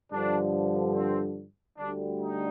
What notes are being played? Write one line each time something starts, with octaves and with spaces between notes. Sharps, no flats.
G2 D3 F3 D4
C4
D2 D3 G3 D4
D#4